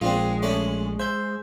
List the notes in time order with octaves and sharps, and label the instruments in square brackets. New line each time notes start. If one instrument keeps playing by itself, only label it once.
[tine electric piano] A#1 [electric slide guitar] G#3 [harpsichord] C4 D4 F4
[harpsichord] A3 C#4 D5
[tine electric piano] C5 G6 [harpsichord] E5